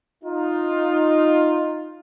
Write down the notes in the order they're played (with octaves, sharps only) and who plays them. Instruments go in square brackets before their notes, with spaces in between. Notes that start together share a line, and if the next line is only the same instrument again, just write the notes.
[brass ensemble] D#4 F4